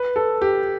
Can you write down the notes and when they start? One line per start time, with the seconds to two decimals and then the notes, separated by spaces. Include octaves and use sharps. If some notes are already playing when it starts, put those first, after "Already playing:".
Already playing: B4
0.16 A4
0.42 G4